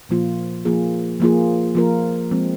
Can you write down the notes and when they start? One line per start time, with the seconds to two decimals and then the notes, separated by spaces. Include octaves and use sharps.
0.09 A#2 F3 A#3 F4
0.65 F3 A#3 F4 G#4
1.20 F3 A#3 F4 G#4
1.75 F3 A#3 F4 A#4
2.31 F3 G#3 C4